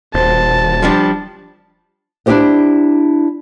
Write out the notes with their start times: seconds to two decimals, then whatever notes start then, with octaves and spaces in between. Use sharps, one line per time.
0.14 D#1 F#4 C5 A5
0.83 F3 G3 D4
2.26 D4 E4 F#4 G4 C5 D#5